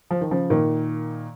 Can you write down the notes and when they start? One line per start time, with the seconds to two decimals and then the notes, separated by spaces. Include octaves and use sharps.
0.11 F3
0.21 D#3
0.31 C#3 F3
0.50 A#2 D#3